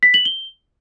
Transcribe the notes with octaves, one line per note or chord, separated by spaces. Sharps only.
B6
F#7
G7